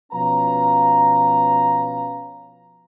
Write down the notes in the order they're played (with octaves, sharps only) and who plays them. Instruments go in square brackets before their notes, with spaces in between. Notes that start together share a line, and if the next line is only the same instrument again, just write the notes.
[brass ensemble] B2 F3 C#4 B4 F5 A#5